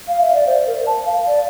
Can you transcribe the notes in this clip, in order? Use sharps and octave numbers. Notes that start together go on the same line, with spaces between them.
F5
E5
D5
C5
A#4
A5
F5
D5